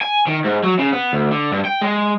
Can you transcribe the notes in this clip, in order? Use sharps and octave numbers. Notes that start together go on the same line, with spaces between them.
G#5
D#3
G#2
F#3
C#3
B3
D2
D3
G2
G5
G#3